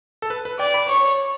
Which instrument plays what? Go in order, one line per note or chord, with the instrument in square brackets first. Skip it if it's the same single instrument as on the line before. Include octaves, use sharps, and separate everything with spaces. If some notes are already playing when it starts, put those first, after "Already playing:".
[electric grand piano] A4
B4
B4
[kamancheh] D5 [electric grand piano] G5
[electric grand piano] B5
[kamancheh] C#5 [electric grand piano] C#6